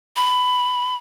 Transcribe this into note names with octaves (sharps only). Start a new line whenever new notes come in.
B5